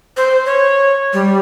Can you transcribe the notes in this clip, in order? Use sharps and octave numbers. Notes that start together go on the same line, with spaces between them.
C5
C#5
G3